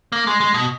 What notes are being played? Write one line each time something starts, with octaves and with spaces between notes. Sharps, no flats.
A#3
G#3
G#3
B2